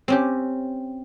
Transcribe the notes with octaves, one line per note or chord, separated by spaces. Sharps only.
C4 C#4 G4